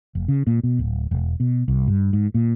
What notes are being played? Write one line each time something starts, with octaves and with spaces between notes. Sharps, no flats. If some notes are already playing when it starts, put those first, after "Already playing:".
F1
C#3
A#2
B2
D1
E1
B2
C2
G2
G#2
A#2